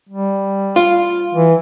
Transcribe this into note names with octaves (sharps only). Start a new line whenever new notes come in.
G3
F4
E3